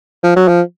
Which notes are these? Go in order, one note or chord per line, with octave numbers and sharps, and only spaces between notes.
F3
F#3
F3